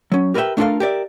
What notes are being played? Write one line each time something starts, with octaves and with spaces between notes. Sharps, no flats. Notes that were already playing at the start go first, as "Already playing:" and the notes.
F#3 C#4
G4 A#4 B4 D5 E5 G5
A3 D4 F4 A4 A#4 F5
G4 A#4 D5 E5